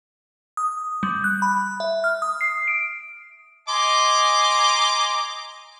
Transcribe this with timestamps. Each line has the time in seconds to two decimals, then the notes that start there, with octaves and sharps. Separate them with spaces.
0.57 D#6
1.03 G3
1.24 F#6
1.42 B5
1.80 E5
2.04 F6
2.22 D#6
2.41 C7
2.68 D7
3.69 D#5 G#5 A#5 C6 D6